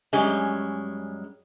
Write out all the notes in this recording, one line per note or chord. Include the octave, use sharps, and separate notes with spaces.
F#2 G3 G#3 C#4